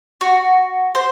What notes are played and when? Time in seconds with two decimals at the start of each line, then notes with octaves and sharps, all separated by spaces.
0.21 F#4
0.95 C5